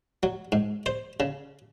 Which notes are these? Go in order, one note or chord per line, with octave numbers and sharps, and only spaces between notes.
F#3
G#2
C5
C#3